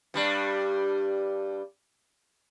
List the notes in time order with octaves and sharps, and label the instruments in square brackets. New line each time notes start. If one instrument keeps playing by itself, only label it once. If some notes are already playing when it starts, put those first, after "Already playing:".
[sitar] G2 G3 D4